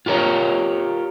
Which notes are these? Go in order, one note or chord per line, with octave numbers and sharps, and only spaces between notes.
F4 G4 A#4 C#5